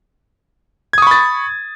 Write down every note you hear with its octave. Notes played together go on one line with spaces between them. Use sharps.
B5 C#6 D#6 G#6 A6